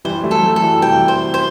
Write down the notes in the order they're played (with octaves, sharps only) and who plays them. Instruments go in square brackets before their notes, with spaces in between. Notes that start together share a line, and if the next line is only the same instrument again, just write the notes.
[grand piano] E3 G3 [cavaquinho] C5
[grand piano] F#3 A3
[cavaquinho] A4
[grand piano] F#3 A3
[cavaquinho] A4
[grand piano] E3 G3
[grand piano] C3 E3 [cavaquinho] G5
[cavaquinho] C5
C5